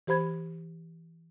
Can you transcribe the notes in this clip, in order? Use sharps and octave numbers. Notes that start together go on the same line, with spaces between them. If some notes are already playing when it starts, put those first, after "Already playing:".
E3 G4 C5 B5 G#6